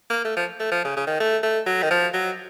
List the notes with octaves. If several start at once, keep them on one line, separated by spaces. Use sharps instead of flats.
A#3
A3
F3
A3
F3
C#3
C#3
D#3
A3
A3
F#3
D#3
F3
F#3